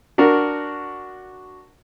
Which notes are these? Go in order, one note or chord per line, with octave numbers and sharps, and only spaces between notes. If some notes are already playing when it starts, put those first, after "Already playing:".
D4 F#4 A#4